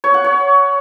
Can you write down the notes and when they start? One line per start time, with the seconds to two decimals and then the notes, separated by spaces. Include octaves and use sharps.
0.04 C#5
0.14 F#5
0.24 C#5